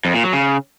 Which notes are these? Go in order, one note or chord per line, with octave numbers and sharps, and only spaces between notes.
F2
A#2
F#3
C#3